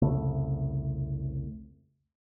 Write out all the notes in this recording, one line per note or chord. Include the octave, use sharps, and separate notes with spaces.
C2 F2 C#3 A3